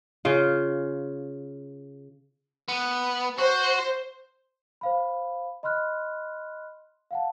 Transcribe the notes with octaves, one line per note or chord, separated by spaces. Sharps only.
C#3 F4
B3
F#4 C5
C5 F5 B5
D#5 B5 C6 F6 F#6
F5 F#5 A5